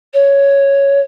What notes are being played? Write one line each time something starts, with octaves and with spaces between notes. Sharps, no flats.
C#5